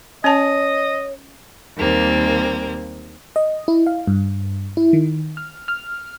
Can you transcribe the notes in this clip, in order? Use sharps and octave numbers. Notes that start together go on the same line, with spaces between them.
C#4 C#5 D#5 A5
D#2 G3 A#3 C4
D#5
E4
F5
G2
E4
D#3
F6
F6